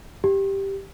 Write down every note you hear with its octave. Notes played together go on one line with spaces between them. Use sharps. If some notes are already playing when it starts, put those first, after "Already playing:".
G4